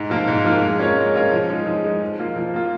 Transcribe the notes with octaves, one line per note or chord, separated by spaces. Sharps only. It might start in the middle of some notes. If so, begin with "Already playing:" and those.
Already playing: G#2
F3 A#3 F4 A#4
G#2
F3 A#3 F4 A#4
G#3
C#4 F4 A#4 C#5
G#3
C#4 F4 A#4 C#5
F3
G#3 D#4
F3
G#3 D#4
F3
A#3 F4
F3
A#3 F4